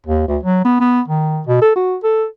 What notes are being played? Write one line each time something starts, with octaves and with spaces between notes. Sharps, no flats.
D#2
D2
F#3
B3
B3
D#3
B2
A4
F#4
A4